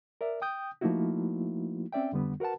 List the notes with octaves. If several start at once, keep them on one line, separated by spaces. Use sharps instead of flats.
A#4 D5 E5
G5 D#6 G6
F3 A3 A#3 D#4 E4 F#4
C4 C#4 D5 E5 G5
F2 D3 G3 B3
F#4 A#4 B4 F#5 A5